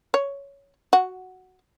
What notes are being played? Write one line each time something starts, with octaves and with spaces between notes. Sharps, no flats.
C#5
F#4